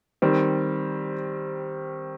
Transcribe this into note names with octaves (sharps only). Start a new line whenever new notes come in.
D#3 G3 C4